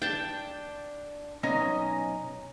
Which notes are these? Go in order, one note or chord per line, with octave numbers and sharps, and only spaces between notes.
D4 G5 A5
B1 B3 C#4 D#5 G#5 A#5